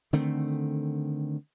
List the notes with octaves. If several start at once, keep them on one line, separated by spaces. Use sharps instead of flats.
D3 D#3 A3 C4